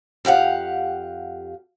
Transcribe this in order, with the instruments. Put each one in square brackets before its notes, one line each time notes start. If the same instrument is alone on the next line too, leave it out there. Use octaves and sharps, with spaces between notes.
[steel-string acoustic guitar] F2 G4 F5 F#5